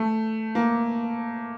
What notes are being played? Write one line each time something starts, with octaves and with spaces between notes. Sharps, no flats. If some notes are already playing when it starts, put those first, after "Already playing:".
Already playing: A3
A#3